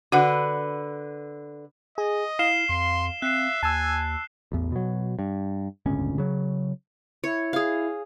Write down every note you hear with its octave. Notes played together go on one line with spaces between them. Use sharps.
D3 F#4 B4 F#5
G#4 D#5
E4 F5 C7 E7 G7
F2 C6
C4 E5 F#6 C7
D#2 G#5 A5 E6
A1 E2
B2 F#3
G2
D1 G1 C#2 C#4
C#3 F#3
E4 C#5
G#4 F5